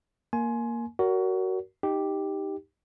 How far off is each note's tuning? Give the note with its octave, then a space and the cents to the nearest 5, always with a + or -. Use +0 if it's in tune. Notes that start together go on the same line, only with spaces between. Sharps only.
A#3 +0 G#5 +20 C6 +15
F#4 +20 A#4 +0 C#5 +35
D#4 +0 G4 +0